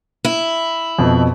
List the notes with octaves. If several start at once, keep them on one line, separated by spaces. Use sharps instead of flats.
E4
F2 B2